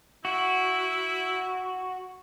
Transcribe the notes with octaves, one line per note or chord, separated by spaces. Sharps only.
E4 F#4